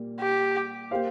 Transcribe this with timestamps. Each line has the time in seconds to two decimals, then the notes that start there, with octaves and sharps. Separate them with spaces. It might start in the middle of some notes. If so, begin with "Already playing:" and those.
Already playing: A#2 G3 A#3
0.21 G4
0.91 A#3 G4 C5 F5